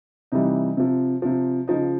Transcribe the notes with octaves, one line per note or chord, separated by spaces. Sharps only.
C3 E3 G3 D#4
C3 F3
C3 F3
C#3 F3 D#4